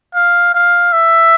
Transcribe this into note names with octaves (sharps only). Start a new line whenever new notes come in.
F5
F5
E5